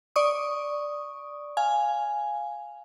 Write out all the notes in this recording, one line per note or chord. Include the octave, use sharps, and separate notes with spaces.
D5 C#6 D#6
F5 G#5